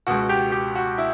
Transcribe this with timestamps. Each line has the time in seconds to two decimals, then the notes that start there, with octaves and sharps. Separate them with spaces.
0.07 C#2 B2 F#4
0.29 G4
0.52 G4
0.75 F#4
0.98 E4